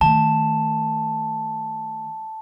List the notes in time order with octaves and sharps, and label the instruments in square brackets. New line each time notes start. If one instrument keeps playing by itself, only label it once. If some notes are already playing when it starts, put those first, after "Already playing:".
[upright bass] D#3 A3 [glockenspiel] A5